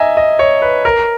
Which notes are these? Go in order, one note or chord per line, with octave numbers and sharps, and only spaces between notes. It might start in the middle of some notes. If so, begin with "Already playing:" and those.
Already playing: D#5 E5 G#5 A#5
D#5
C#5
B4
A#4